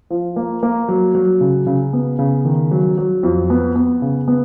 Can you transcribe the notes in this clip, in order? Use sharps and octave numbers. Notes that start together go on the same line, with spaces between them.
F3
A#3
A#3
F#3
F#3
C#3
C#3
B3
C#3
D#3
F#3
F#3
F2
B3
B3
C#3
B3